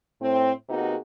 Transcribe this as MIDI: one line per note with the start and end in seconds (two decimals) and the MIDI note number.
0.21 0.52 45
0.21 0.52 60
0.69 0.96 48
0.69 0.96 58
0.69 0.96 59
0.69 0.96 63
0.69 0.96 66
0.69 0.96 68